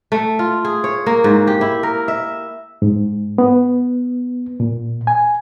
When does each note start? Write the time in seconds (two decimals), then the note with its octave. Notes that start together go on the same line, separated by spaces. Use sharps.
0.12 A3
0.39 F4
0.65 G#4
0.84 C#5
1.06 A#3
1.24 G#2
1.47 G4
1.61 E4
1.83 A#4
2.08 E5
2.82 G#2
3.38 B3
4.60 A#2
5.07 G#5